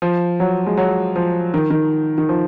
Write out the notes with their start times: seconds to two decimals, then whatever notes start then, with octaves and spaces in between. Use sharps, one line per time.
0.02 F3
0.40 F#3
0.67 G#3
0.77 F#3
1.16 F3
1.54 D#3
1.70 D#3
2.18 D#3
2.29 F3